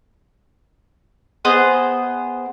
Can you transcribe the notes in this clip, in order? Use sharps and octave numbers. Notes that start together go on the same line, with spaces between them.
B3 G#4 C5 D#5